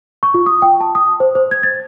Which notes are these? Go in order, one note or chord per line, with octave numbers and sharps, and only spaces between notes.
C#6
F4
D#6
G5
A5
D#6
C5
C5
G#6
A6